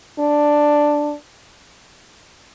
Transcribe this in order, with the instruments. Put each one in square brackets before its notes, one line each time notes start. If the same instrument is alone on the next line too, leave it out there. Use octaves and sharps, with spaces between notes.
[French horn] D4